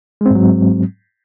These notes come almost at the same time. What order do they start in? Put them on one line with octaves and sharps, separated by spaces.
G#3 C4 G#2 F#3